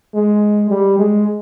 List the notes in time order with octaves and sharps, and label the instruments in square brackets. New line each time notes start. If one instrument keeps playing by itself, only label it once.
[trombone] G#3
G3
G#3